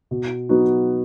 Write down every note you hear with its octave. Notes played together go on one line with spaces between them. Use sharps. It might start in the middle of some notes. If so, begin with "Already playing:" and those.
B2
F#3 B3 D#4 F#4